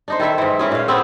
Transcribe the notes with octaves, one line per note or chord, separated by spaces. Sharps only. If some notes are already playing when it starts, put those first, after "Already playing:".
D4 D#4 C5
D#3 E4 A4 E5
G#2 E3
E3 C#4 G#4
A#2 F5
B3 C4 E4 E5